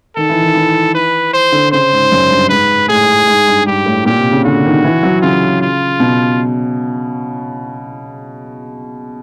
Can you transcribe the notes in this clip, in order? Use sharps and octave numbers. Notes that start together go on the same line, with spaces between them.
D#3 A4
E3
D#3
E3
B4
C5
D3
C#3 C5
G#2
F#2
G2
G#2 B4
A2 G#4
G#2
G2
G2 G4
A2
A#2 G4
C3
C#3
D3 F#4
D#3
E3
F#3
C#3 F4
F4
B2